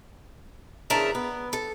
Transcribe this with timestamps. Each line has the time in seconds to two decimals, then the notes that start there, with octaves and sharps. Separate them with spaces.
0.90 E2 C#3 D4 A#4 E5 A5
1.15 B3
1.53 A4